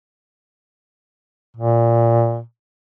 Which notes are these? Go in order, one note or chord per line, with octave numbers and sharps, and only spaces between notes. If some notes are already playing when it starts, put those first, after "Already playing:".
A#2